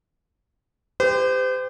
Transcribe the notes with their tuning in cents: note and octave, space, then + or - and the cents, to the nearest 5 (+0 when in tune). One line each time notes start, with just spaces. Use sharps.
G4 +25 C5 -40